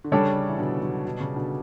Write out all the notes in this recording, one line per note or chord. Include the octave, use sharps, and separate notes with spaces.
D3
C#3 G3 D4 A4 C#5
E3
B2 D3
D3 F#3
B2
C#3
B2 D3